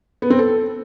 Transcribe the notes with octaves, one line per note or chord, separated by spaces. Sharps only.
B3
C4
A4